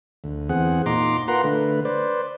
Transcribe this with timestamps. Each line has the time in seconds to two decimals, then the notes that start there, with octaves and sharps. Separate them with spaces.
0.24 D2
0.49 E2 C4 G#4 F#5
0.86 A#2 D#4 A#5 C6 D6
1.28 F4 A#4 B4 F#5 A#5 C6
1.44 D3 A3 B4
1.85 B4 C5 D5